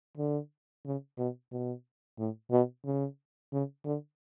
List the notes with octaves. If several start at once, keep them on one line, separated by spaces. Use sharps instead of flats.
D3
C#3
B2
B2
A2
B2
C#3
C#3
D3